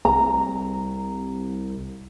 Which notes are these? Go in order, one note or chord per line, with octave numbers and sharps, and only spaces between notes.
C2 A#5